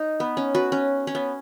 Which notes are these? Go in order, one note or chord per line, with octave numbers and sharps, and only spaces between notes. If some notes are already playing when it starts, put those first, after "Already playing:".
Already playing: D#4
B3
C#4
F#4 B4
C#4
C#4
B3